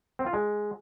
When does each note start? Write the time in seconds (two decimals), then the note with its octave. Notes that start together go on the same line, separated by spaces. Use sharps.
0.19 C4
0.26 F4
0.33 G#3